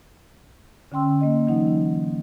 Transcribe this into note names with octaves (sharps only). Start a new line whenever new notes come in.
D3 C#4 G5 C6 E6
A#3 D#5
E3 F#3 D#4 F#5